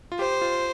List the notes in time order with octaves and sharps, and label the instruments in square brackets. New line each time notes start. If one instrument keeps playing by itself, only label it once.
[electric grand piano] F4
[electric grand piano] G4 [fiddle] C5
[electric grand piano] F4